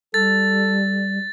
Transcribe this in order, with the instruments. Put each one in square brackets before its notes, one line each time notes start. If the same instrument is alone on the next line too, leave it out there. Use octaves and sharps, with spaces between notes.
[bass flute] G3 [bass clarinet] A4 [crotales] A6